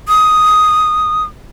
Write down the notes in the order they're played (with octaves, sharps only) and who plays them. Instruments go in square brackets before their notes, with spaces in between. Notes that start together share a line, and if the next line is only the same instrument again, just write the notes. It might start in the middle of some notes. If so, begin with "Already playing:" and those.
[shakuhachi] D#6